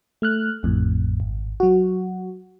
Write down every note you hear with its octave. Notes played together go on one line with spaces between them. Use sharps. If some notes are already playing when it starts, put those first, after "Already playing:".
A3 F6 F#6
A1 F2 A2
G#1
F#3 F#4